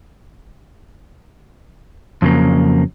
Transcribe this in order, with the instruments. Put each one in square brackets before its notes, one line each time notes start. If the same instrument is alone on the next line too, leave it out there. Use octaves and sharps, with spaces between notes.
[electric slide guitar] F2 C#3 F#3 A#3